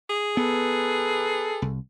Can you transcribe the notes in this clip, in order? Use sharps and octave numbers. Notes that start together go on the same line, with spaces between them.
G#4
B3 A4 B4
C2